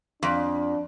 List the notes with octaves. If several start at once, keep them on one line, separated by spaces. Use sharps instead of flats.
F2 D4